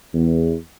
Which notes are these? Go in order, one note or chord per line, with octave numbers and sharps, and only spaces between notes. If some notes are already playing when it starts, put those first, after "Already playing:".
E2